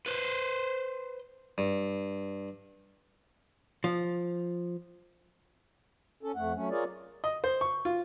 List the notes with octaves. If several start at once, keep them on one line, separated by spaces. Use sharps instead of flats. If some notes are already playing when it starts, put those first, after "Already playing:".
B4 C5
G2
F3
C#4 A4
F2 A3 F#5
F#3 A3 C#4
F4 G#4 A#4 C#5 D5
D#5
C5
C#6
F4